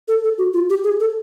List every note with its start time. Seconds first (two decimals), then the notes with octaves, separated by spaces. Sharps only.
0.08 A4
0.24 A4
0.38 F#4
0.54 F4
0.70 G4
0.84 G#4
1.00 A4